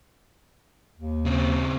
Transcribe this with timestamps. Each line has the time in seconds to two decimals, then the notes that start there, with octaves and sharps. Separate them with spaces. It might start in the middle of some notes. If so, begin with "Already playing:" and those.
0.98 D#2
1.25 C#3 C4